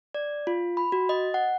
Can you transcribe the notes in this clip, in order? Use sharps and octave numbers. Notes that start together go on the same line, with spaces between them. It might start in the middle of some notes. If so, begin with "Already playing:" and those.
D5
F4
B5
F#4
D#5
F#5